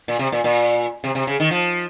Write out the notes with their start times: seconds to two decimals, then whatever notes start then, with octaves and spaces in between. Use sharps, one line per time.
0.08 A#2
0.19 C3
0.32 A#2
0.44 A#2
1.04 C3
1.15 C3
1.27 C#3
1.40 D#3
1.51 F3